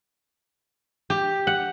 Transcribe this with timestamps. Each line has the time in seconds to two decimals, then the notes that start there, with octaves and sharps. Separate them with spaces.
1.10 G4
1.47 F#5